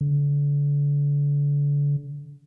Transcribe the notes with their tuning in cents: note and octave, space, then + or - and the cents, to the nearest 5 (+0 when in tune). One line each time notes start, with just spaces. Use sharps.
D3 -35